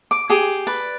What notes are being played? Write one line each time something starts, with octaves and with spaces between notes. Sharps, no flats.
D6
G4 G#4
B4 D5